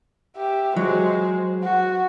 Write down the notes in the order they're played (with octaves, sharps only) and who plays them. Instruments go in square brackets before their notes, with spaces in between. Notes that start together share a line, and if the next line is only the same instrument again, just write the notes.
[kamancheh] G4 E5
[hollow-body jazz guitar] F#3 [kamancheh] G#3 C5
[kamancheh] F#4